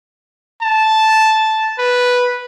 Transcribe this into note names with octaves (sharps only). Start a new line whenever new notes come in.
A5
B4